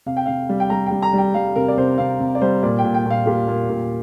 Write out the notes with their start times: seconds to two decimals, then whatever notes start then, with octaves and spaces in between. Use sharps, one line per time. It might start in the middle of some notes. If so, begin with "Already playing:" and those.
0.06 C3 F5
0.17 G5
0.26 C3 F5
0.49 G3
0.60 G5
0.70 G3 A#5
0.86 G3 G5
1.02 A#5
1.13 G3 G5
1.34 G3 F5
1.56 C3 A#4
1.68 D5
1.77 C3 C5
1.98 C3 F5
2.20 C3
2.35 D5
2.41 G3 C5
2.63 A#2 D5
2.79 G5
2.84 A#2
2.94 G5
3.06 A#2 F5
3.26 A#2 G4
3.48 A#2
3.70 A#2